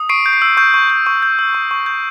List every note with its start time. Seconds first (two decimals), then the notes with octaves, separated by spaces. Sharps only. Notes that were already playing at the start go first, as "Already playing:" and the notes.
Already playing: D#6
0.09 C#6 C7 D7
0.26 G6
0.33 C7
0.42 E6
0.57 C#6 G6
0.74 C#6
0.90 G6
1.07 C#6
1.23 G6
1.39 E6
1.55 C#6
1.71 C#6
1.86 G6